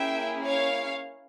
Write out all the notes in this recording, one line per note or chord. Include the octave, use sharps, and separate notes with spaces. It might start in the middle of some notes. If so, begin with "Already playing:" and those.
Already playing: A#3 C#4 E4 G#4 E5 G5
C#5 F5